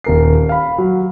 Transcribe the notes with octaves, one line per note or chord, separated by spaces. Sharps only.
D#1 A#4 C7
F5 B5
F#3